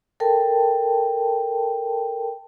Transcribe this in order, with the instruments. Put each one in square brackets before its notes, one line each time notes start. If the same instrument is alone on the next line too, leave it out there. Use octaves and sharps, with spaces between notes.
[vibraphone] A4 A#4 G5 A5